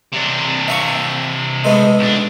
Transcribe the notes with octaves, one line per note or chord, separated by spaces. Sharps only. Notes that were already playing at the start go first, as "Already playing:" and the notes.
C3 D4
E5 F5 C#6
G#3 A3 B3
B1 D4